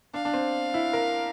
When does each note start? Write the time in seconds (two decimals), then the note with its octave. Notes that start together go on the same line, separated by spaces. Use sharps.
0.14 D4 F5
0.25 D4
0.34 C4
0.74 E4
0.93 A#4